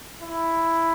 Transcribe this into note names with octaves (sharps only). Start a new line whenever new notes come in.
E4